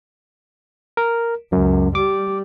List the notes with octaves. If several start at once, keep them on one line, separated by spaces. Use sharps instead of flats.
A#4
C#2 F#2
G3 D6